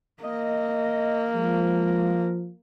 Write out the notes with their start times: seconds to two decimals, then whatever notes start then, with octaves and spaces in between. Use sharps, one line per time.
0.23 A#3 D#5
1.34 F3 G#3